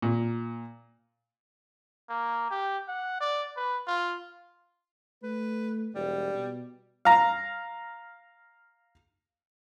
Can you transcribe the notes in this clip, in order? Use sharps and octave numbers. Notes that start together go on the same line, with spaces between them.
A#2
A#3
G4
F#5
D5
B4
F4
A3 B4
E1 G3
B2
F5 A#5